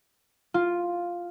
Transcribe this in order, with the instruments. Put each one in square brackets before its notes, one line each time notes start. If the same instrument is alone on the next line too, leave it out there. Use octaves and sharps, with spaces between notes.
[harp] F4